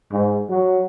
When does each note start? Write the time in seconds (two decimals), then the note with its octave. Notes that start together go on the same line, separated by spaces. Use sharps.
0.13 G#2
0.50 F#3